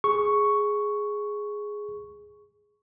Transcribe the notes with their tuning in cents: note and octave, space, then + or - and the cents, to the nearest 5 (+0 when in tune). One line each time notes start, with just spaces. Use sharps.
G#4 +0 C#6 +0